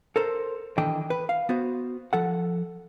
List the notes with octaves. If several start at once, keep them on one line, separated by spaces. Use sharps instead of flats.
A4 A#4 C5
D#3 E3 D4 A4 D#5 G5
B4
F5
B3 F#4 C5
F3 A4 F#5